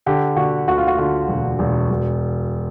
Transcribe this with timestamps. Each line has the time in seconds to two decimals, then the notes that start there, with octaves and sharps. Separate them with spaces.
0.06 D3 G4
0.36 D3 F#4
0.67 D2 F#4
0.78 F4
0.87 F#4
0.98 D3 F4
1.28 E1
1.59 E1
1.90 E1